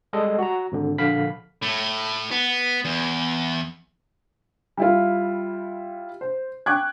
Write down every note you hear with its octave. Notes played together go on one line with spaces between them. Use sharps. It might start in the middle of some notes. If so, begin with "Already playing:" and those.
G3 G#3 A4 D#5
F#4 A#5
G#1 D3
A#1 D3 F5 B5 B6
A2
B3
E2
G3 E4 F4
C5
G5 C#6 D6 F#6 G#6